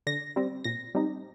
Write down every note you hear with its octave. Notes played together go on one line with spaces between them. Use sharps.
D3 A#6
G3 C4
A#2 A#6
G3 C4 D#4